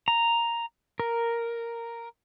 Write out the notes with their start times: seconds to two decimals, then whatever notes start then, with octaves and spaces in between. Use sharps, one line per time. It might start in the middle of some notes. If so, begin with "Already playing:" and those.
0.08 A#5
1.00 A#4